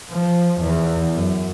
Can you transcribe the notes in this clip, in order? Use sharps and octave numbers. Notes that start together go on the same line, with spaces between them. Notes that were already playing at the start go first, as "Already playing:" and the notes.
F3
E2
F#2